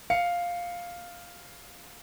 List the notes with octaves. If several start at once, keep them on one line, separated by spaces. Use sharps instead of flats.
F5 C#7